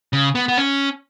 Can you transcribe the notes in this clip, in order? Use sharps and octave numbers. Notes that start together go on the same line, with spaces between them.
C#3
B3
B3
C#4